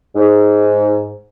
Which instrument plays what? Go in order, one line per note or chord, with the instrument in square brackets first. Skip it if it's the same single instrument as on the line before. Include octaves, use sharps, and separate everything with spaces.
[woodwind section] G#2